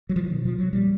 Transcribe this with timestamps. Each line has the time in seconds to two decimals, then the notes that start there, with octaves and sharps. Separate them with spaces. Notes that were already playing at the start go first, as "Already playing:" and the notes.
0.09 F#3
0.16 F3
0.24 E3
0.30 B2 D#3
0.45 F3
0.59 F#3
0.73 A#2 G3